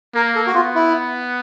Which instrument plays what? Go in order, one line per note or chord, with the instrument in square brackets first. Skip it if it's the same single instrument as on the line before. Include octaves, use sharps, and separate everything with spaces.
[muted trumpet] A#3 [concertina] A#4
[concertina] A4
F#4
[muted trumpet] B3 [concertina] F4
[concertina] E4